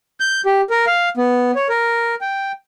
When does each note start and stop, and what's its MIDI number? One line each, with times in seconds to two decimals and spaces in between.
0.20 0.41 91
0.46 0.61 67
0.70 0.85 70
0.87 1.09 77
1.17 1.51 59
1.55 1.67 73
1.69 2.15 70
2.21 2.52 79